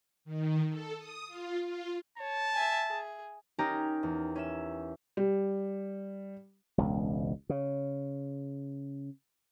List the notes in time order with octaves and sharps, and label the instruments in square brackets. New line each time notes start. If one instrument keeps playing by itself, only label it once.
[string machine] D#3
A4
D#6
F4
F4
[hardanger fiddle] C#5 [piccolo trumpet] A5
[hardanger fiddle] E5 G#5
G#4
[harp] C#4 D#4 G4 A#4 A#5
E2
C#4 E5 E7
[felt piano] G3
[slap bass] E1 C#2
C#3